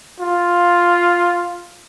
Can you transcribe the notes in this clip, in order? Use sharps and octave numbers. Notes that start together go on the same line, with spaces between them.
F4